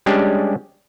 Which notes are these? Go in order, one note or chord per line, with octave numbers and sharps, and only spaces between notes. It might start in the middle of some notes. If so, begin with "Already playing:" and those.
G3 G#3 C#4 D4 G4